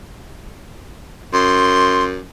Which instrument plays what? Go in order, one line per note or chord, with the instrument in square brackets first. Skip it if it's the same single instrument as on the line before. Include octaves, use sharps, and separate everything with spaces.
[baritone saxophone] F#2 [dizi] C6